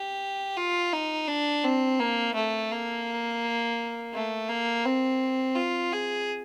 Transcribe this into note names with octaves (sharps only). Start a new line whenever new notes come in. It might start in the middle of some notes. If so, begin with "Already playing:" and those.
Already playing: G4
F4
D#4
D4
C4
A#3
A3
A#3
A3
A#3
C4
F4
G#4